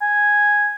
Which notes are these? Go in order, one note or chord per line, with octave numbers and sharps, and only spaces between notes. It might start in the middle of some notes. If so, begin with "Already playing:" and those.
G#5